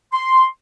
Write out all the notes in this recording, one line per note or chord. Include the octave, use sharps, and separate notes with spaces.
C6